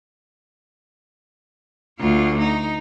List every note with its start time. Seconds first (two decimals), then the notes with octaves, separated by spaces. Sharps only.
1.99 D2 F4
2.39 D#4